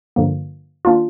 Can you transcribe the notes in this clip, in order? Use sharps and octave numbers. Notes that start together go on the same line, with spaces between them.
G2 D3 F3 A#3
D#3 A#3 D4 F4